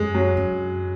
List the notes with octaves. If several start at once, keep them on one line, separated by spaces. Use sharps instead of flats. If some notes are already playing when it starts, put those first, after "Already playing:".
Already playing: F#2 G#3
F#3
F#2